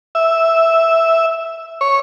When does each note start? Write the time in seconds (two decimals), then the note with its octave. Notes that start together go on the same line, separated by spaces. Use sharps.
0.15 E5
1.81 C#5